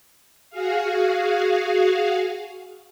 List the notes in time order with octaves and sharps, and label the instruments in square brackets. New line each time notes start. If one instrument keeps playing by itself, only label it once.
[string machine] F#4 G#4 F5